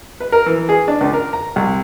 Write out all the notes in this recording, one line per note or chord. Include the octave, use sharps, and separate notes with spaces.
B4
A#4
E3
G#4
D4
C#2
A#4
A#5
C2